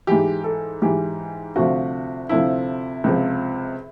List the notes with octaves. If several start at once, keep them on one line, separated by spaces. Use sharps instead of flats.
G#2 E3 G4
A4
G#2 E3 G4
D2 C3 F3 F#4
D2 C3 F3 E4
C#2 C3 F3